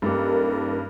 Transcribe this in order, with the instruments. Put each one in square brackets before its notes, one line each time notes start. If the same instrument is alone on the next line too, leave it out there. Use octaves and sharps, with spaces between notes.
[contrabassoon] D#1 [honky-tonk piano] G2 [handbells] D#4 G4 [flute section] A4 A#4